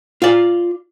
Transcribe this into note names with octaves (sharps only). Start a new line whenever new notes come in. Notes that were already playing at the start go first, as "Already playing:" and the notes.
F4 D5